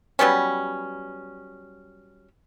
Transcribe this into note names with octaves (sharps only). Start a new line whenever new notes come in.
F#3 G3 B3 C#4